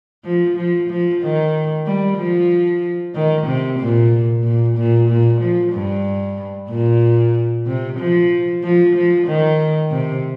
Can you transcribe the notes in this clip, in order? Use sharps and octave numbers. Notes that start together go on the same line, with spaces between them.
F3
F3
F3
D#3
G3
F3
D#3
C3
A#2
A#2
A#2
A#2
F3
G2
A#2
C3
F3
F3
F3
D#3
C3